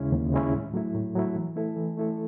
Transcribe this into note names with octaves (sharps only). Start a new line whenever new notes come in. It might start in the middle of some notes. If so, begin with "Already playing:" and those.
Already playing: D#2 C#3 G#3 C#4 E4
D#2
C#3 G#3 C#4 E4
A2
F#3 A3 E4
A2
F#3 A3 E4
E3
A3 E4 A4
E3
A3 E4 A4